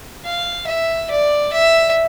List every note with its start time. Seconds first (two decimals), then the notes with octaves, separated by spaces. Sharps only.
0.25 F5
0.67 E5
1.10 D5
1.53 E5